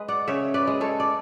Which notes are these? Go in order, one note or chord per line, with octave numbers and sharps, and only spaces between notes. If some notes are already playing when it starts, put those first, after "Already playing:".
Already playing: G#3 B4
D5 F#5
C#3 C#5 E5
B4 D5
G#3
A4 C#5
D5